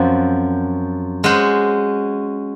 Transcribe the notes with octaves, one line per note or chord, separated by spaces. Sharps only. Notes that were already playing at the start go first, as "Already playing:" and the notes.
Already playing: F#2 F3 C4 F#4
G#3 C#4 F#4 C5